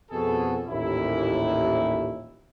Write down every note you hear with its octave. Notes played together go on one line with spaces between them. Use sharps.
F2 B2 F#4 G#4 A4
A1 D#2 A#2 E4